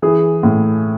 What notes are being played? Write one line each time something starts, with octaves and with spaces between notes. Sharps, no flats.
E3 G#4
A2